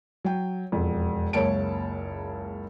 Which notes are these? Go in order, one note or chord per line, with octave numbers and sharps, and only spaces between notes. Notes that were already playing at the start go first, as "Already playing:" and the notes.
F#3 G5
E1 F2
F#1 C#2 A#3 C#5 A5 D7